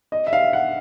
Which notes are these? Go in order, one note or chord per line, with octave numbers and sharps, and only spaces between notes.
D#5
E5
F5
F#5